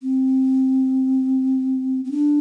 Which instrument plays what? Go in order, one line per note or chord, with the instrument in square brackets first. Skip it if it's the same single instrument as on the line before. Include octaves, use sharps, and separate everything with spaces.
[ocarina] C4
C4
D4